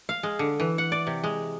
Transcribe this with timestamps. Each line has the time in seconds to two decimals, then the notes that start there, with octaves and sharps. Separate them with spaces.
0.09 F5
0.23 G#3
0.39 D3
0.60 E3
0.78 F#5
0.92 D5
1.07 C3
1.24 G#3